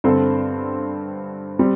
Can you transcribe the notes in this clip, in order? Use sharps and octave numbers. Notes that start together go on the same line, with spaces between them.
G2 D3 C4 A4 C5
G3 C4